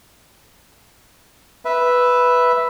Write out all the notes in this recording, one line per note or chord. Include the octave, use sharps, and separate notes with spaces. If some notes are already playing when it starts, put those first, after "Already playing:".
B4 E5